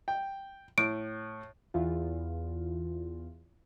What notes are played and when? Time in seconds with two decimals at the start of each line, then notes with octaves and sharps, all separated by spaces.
0.08 G5
0.78 A2 D7
1.74 E2 F4